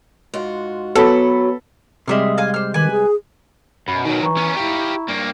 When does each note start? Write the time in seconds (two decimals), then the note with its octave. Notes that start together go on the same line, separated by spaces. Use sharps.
0.34 G#2 F4 F#4
0.95 F#3 B3 A4 B5
2.08 C3 G3 G#3 E5 D#6 F6
2.38 D#5 F5 G#5
2.54 C5 F6
2.74 D#3 B4 G#5
2.91 G#4
3.88 F#2 B2 B5
4.05 D#3 F#3 D#4
4.22 E3 A#5 C#6
4.37 B3 C#4
4.57 E4 G4 F5
5.09 G2 A#3